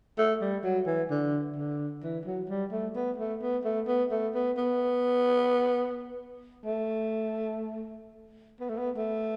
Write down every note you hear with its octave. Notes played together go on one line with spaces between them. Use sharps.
A3
G3
F#3
E3
D3
D3
E3
F#3
G3
A3
B3
A3
B3
A3
B3
A3
B3
B3
A3
B3
A3
B3
A3